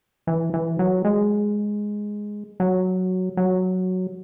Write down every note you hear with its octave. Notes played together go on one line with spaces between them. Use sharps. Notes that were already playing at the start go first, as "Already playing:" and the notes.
E3
E3
F#3
G#3
F#3
F#3